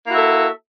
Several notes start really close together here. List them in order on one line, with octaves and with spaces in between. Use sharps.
A#3 E4 F#4 E5 A4